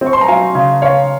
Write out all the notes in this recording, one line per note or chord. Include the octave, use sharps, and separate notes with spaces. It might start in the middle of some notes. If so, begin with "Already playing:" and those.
C4
C#6
C6
A#5
F#3 F5 G#5
C#3
C#3 C#5 F5